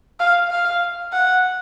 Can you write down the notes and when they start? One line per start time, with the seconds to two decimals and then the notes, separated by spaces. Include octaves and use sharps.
0.20 F5
0.50 F5
1.13 F#5